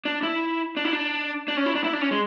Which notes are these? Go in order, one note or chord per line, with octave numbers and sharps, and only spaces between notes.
D4
E4
D4
E4
D4
D4
C#4
E4
D4
E4
D4
C#4
G#3